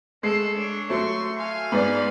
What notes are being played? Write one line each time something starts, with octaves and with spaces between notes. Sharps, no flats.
G#3 A3 A4 C7
D4 C#5
F#3 A3 C6 C#6
F5 G#5
G#2 B3 D5